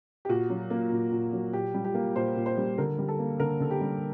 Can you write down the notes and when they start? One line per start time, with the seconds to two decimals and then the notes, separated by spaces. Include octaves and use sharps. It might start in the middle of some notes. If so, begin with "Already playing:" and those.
0.25 G4
0.29 A#2 F#4
0.50 F#3
0.70 A#3
0.92 A#2
1.12 A#2
1.33 F#3
1.53 A#2 G4
1.74 G3
1.85 G4
1.94 A#3
2.16 A#2 C5
2.36 A#2
2.46 C5
2.57 G3
2.78 D3 A#4
2.98 G3
3.08 A4
3.19 A#3
3.39 D3 A#4
3.60 D3 A4
3.71 G4
3.81 G3